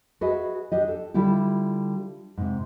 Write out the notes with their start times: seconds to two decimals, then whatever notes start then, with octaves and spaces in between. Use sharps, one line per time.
0.21 F#4 G#4 B4 D#5 E5
0.72 D4 G4 D#5
0.88 A4
1.14 D3 G3 E4 F4 G4
2.37 G#2 C3